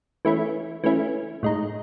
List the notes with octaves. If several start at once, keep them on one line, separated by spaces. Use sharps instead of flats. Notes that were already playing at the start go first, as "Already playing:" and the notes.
E3 A3 C#4 E4
E3 A3 C#4 E4
A2 G#3 D#4